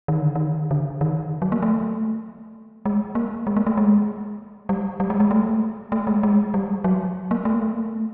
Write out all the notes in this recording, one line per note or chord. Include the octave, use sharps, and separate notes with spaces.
D#3
D3
D#3
D3
D#3
F#3
A#3
A3
G#3
A#3
G#3
A#3
A3
G#3
G3
G3
G#3
G#3
A3
A3
G#3
G#3
G3
F#3
A#3
A3
A#3
A3